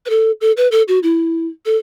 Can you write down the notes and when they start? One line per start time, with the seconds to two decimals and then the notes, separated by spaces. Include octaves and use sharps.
0.06 B4
0.10 A4
0.41 A4
0.57 B4
0.72 A4
0.88 F#4
1.03 E4
1.66 A4